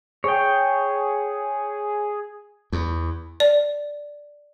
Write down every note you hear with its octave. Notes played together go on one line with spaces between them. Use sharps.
G#4 C#5 G5
E2
D5